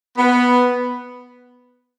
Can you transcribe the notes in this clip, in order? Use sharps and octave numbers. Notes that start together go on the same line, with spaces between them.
B3